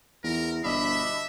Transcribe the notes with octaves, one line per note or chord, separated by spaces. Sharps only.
E2 A#4
G1 B2 D4 D#5 E5 B5